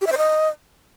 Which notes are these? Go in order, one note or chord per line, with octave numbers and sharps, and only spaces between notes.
G4
E5
C5
D#5